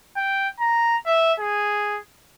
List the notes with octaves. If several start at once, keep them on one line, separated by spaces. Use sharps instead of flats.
G5
A#5
E5
G#4